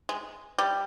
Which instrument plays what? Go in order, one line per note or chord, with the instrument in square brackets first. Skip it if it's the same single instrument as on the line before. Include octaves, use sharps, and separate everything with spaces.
[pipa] G#3
G3